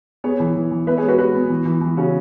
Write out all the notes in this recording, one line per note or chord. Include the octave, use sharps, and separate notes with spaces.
B3 G#4 C#5
E3
E3
E3
B3 B4 E5
G#3 G#4 C#5
F#4 B4
G#3 F#4 B4
B3
E3
E3
E3
C#3 C#4 F#4